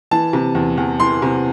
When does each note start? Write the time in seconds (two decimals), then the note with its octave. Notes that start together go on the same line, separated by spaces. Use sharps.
0.11 E3 A5
0.33 C3
0.55 E2
0.77 E2
0.99 E3 C6
1.22 C3